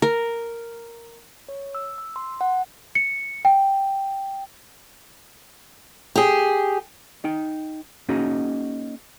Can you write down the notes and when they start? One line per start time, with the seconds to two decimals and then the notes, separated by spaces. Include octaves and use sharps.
0.02 A#4
1.49 C#5
1.75 E6
1.98 E6
2.16 C6
2.41 F#5
2.95 C#7
3.45 G5
6.16 G4 G#4
7.24 D#4 G5
8.09 A#3 C#4 D#4 F#4 G#4